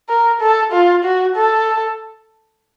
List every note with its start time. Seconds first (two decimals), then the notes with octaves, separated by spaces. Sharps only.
0.09 A#4
0.41 A4
0.72 F4
1.04 F#4
1.36 A4